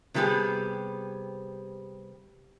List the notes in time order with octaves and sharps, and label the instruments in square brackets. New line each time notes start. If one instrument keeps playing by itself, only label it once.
[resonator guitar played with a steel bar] C3 F#3 G3 B3 G4 G#4